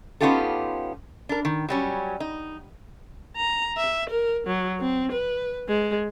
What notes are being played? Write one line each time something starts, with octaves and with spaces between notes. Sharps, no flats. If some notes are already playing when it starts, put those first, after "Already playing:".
B3 C#4 D#4 F4 G4 A4
D4 A#4
D#3
F#3 G3 C#4
D#4
A#5
E5
A#4
F#3
C4
B4
G#3